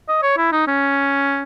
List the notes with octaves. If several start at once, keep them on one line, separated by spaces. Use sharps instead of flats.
D#5
C#5
E4
D#4
C#4